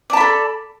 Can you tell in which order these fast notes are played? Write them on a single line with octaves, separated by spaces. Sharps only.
D5 A5 B5 A4